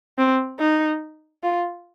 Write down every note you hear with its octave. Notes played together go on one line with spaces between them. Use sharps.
C4
D#4
F4